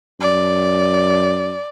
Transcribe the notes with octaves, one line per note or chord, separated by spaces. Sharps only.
F#2 D5